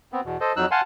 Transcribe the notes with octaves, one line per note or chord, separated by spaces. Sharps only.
B3 C4
E2 B2
A4 C5 D#5
F2 F#3 D#4 E6 F#6
F5 F#5 G#5 A5 C6